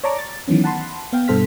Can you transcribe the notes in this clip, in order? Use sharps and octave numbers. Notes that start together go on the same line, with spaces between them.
C#5 D5 A5 A#5 C#6 D6
A6
D#3 E3 F#3 B3 C#4
F#5 A5 B5 C6
B3 F5 G5
G2 B2 A4 C5 F6 B6